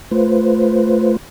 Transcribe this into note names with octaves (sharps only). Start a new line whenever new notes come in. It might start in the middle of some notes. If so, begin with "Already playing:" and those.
A3 F4 B4 C5